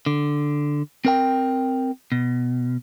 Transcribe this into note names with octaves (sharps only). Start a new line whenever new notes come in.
D3
C4 A#4 G5
B2